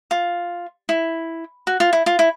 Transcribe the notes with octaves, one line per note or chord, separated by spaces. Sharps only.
F4
E4
F#4
F4
E4
F4
E4